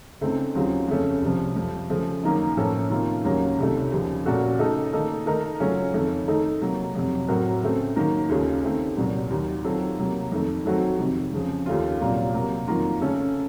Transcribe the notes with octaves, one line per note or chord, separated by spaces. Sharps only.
C#2 C#3 A3 C4 D#4
D#2 C#3 F#3 C4 F4
F2 C#3 A3 C#4
C2 C3 F3
F2 C3 F3
C#3 F3 A3
F#2 D#3 A#3 D#4
A2 F3 A#3 C#4 A4
C3 D#3 A#3 C#4 F4
D#2 C#3 F#3 A#3 C#4
C2 C3 D#3 A3
D#2 C#3 F3
A#2 A3 C#4 F#4 A4
C#3 A3 D#4 A4
D#3 A#3 D#4 A4
D#3 A3 D#4 A#4
C#3 F#3 A3 C#4 F4
F2 D#3 A3
D#3 A3 D#4 A4
C3 F#3 A#3
F2 C3 F#3
A2 F#3 C4 F#4 A#4
C#3 A3 C4
D#3 F#3 A#3
D#2 C#3 A3 C#4 F4
D#3 A3 C4
C2 A#2 F#3
D#2 D#3 F#3
D#3 F#3 C4 F4 A4
C3 F#3 A#3
F2 D#3 A3
D#3 F#3 A3 C4 F#4
F2 C3 D#3
F2 C#3 F3
D#2 D#3 A3 C#4 F4
C2 A#2 F#3 A#3 F4
C3 F#3 A#3
F2 D#3 F#3 A#3 F4
C#3 A3 C#4 A4